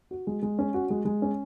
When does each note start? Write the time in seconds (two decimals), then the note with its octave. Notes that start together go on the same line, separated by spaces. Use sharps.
0.11 F#4
0.27 G#3
0.42 G#3
0.59 C#4
0.74 F#4
0.90 G#3
1.05 G#3
1.22 C#4